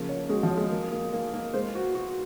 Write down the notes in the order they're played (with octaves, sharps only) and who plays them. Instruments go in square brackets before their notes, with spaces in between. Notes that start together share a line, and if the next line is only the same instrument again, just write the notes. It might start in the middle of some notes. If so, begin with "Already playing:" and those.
Already playing: [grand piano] C#3 F3 [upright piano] A#3
[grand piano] C#5
[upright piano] G#3 [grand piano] F#4
[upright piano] F3
[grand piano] C#5
[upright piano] G#3
[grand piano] A#3
A#3
A#3
A#3
[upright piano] G#3 [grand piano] C5
[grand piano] F#4
F#4